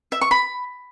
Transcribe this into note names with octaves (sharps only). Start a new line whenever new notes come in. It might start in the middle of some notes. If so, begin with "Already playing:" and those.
E5
C#6
B5